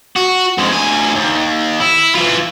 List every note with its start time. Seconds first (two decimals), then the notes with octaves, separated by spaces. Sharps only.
0.16 F#4
0.58 F2 G#3
0.71 D2 G#5
1.15 D#2
1.80 E4
2.15 E3 F4